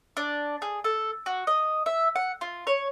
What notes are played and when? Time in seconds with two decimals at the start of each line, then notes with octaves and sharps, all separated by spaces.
0.17 D4
0.62 G#4
0.84 A4
1.26 F#4
1.47 D#5
1.86 E5
2.16 F#5
2.41 F4
2.67 C#5